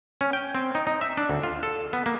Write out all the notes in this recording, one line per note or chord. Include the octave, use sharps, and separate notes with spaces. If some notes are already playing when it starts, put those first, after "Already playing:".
C#4
G5
C4
D#4
D#4
E5
D4
D2
F4
A4
B3
A#3